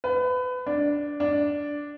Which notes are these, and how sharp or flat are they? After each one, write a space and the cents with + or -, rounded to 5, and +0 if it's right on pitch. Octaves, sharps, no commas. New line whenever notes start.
B4 +25
D4 -5
D4 -5